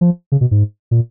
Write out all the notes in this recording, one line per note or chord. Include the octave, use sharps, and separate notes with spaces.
F3
C#3
B2
G#2
A#2